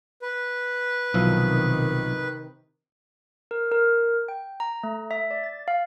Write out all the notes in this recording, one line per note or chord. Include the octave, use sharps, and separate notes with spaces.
B4
B1 C3 D#3 F3 E4
A#4
A#4
G5
A#5
A3
E5
D5
A6
F5